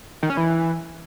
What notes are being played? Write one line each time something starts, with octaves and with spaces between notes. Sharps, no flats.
D#3
C#4
E3